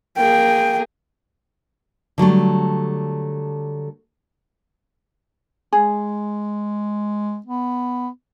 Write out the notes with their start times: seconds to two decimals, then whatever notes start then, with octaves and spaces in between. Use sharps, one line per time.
0.17 A#3 G#4 G5
2.18 D3 F#3 G3 A3
5.73 G#3 G#4
7.46 B3